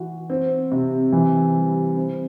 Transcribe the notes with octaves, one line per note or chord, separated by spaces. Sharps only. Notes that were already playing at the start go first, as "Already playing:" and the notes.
Already playing: E3 F#4
C4
C3
E3
G3
C4